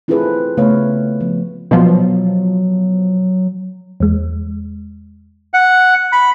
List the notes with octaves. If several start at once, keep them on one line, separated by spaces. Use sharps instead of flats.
C4 E4 F4 G#4 A4 B4
C#3 A3 B3 B4 C#5 F5
F3 B3
B2 F3 F#3
E2 G#3
F#5
B5